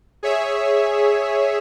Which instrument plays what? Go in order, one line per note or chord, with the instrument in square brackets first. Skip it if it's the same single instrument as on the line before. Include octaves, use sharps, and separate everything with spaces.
[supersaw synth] G#4 C#5 E5